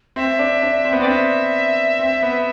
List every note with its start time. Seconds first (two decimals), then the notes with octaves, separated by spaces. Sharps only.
0.16 C4 E5
0.39 D4
0.62 D4
0.85 C4
0.93 B3
1.00 C4 D5
1.08 D4 E5
1.99 C4
2.22 B3